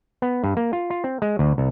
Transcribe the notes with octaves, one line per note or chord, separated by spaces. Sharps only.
B3
G2
A#3
F4
F4
C4
G#3
D2
C2